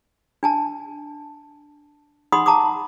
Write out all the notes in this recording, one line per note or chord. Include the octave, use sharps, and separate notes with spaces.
D4 G#5 A5
D#4 F#5 B5 C6 D#6
A5 A#5 D6 D#6